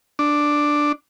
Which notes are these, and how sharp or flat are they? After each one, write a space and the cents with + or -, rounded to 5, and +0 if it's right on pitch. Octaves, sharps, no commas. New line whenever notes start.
D4 +5